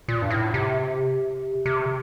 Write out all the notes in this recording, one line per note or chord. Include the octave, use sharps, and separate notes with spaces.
A#2
G2
A2
C3
C3